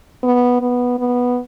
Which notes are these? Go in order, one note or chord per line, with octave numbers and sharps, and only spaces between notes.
B3
B3
B3